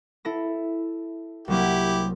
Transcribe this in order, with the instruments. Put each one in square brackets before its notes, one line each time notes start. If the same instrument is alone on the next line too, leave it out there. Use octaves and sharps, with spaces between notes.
[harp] E4 A4 A#6
[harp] C2 F#3 A#3 [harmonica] E4 G4